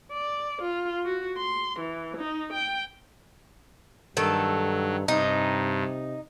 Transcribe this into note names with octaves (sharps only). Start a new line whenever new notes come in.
D5
F4
F#4
C6
E3
D#4
G5
G2 D#3 F#3 A4
G2 C3 D#4